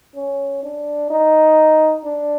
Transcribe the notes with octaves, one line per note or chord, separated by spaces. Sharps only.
C#4
D4
D#4
D4